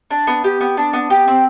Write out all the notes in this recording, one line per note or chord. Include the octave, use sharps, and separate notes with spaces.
D4
B3
G4
B3
D4
B3
G4
C4